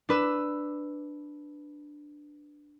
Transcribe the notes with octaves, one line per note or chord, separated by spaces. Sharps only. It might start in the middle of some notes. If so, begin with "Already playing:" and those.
D4 B4 E6